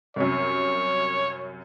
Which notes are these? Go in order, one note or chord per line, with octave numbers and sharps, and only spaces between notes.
C2 F#2 C#5